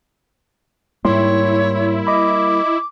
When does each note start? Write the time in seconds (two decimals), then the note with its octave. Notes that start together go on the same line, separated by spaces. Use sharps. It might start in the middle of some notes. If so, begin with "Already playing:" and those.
1.05 G#2 G3 A#3 E4 C#5 C6
2.07 D#5 B5 D6